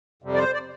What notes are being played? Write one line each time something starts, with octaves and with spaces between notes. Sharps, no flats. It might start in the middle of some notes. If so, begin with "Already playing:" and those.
F2 C3 G3
D5
C5
D5